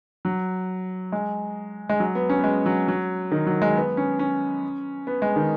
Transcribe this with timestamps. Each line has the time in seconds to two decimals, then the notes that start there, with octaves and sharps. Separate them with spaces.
0.25 F#3
1.12 G#3
1.90 G#3
2.00 F#3
2.15 B3
2.30 C#4
2.39 B3
2.44 G#3
2.66 F#3
2.88 F#3
3.31 D#3
3.47 F#3
3.62 G#3
3.76 B3
3.97 C#4
4.19 C#4
5.07 B3
5.22 G#3
5.36 D#3